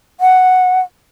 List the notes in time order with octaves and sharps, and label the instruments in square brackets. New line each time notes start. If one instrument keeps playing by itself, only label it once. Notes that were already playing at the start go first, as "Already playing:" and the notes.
[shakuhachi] F#5